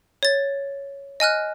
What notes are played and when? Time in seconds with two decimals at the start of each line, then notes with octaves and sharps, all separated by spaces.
0.23 C#5 A6
1.20 D#5 G#5 F6 F#6